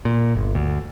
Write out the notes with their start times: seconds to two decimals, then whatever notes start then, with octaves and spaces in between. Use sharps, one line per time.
0.05 A#2
0.35 G1
0.55 D2